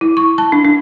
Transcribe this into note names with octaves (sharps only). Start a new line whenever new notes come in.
E4
C#6
A5
D4
D4